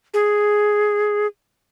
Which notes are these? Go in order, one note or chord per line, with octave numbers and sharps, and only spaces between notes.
G#4